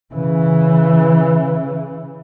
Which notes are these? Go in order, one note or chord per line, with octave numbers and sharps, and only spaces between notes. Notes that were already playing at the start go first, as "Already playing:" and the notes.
C#3 E3